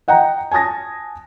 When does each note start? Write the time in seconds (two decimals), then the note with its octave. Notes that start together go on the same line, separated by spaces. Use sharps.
0.08 D#5 F#5 G5 A#5
0.51 G#5 A5 D#6 A6 A#6